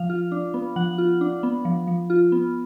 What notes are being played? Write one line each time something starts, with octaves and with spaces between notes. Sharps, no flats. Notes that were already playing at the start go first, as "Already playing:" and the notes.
Already playing: F3 F5
F4
D4
B3
F3 F#5
F4
D4
B3
F3
F3
F4
B3